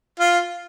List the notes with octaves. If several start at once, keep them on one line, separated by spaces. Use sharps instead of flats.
F4